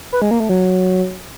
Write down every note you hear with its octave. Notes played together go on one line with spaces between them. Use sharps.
B4
G#3
A#3
A3
F#3